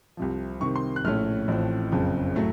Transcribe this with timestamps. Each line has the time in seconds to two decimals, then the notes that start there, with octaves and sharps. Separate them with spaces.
0.17 C2 C3 F3
0.61 C2 C3 D#3 C#6
0.76 C6
0.96 F#6
1.04 A#1 A2 A3 C#4 F6
1.48 A1 A2 F3 C4
1.92 F#1 F2 C#3 F3
2.35 A2 F#3 A3